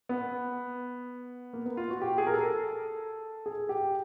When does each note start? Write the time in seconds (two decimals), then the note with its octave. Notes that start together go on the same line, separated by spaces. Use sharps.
0.09 B3
1.53 A#3
1.66 B3
1.77 F4
1.90 F#4
2.01 G4
2.18 G#4
2.27 A#4
2.34 A4
3.46 G#4
3.69 G4